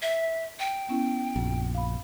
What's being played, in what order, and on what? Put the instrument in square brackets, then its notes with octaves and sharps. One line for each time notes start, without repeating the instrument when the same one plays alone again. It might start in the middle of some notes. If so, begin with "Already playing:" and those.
[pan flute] E5
G5
[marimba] B3 C#4 E4
[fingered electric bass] A#1 [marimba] F#2
[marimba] F5 B5